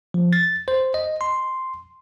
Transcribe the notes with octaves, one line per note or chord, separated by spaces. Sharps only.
F3
A6
C5
D#5
C6